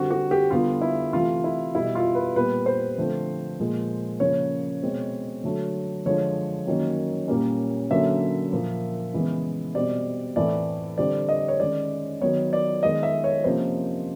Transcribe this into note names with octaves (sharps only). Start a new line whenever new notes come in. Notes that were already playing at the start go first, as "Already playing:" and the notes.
Already playing: D3 G3 C4 F#4
F#4
G4
D3 G3 B3 F4
E4
C3 E3 A3 F4
E4
B2 G3 B3 E4
F4
B4
A#2 G3 B3 B4
C5
D3 F3 A3 C4
A#2 F3 G#3
C#3 F3 A#3 C#4 C#5
B2 G#3 C4
D3 F#3 A3
D3 F3 G#3 C#5
D#3 F#3 A#3 C#4
A#2 G3 A#3 C#4
D3 F#3 A#3 C#4 E5
A#2 F3 A#3
C#3 E3 G#3 B3
B2 G3 C4 D5
A2 E3 A3 C4 D5
D3 G3 C4 D5
D#5
C#5
D#3 G#3 C#4 D5
D#3 F#3 B3 C#5
D5
D#3 G#3 B3 D#5
E5
C#5
C3 F3 A#3 C#4 C5